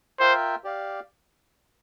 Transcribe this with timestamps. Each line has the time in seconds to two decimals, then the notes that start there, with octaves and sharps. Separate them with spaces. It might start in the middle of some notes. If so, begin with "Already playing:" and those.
0.20 F4 A#4 C5 E5 G5
0.64 G4 D5 F5